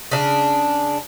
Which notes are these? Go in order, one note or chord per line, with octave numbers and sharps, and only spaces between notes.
C#3 D4